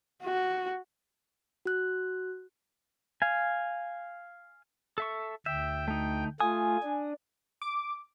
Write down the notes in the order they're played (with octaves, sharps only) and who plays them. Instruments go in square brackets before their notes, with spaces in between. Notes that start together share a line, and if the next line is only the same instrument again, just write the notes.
[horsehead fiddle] F#4
[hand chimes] F#4 F#6
[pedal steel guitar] F5 G#5
A4 E5 C#6
[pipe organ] D2 G5 [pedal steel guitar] E5
[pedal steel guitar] A3 D#4
[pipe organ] A3 F4 [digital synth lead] G#5 [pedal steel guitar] D#6
[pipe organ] D4
[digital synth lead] D6